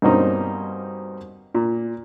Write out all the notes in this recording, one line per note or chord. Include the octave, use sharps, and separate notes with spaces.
G2 B2 A#3 C4 C#4 D#4
A#2